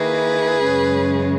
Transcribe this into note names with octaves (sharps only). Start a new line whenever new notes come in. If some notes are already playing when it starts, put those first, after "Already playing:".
Already playing: D#3 A#3 E4 G#4 B4
F#2 C#3 G#3 C#4